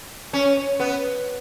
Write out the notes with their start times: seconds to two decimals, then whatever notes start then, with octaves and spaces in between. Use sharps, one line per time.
0.33 C#4
0.80 B3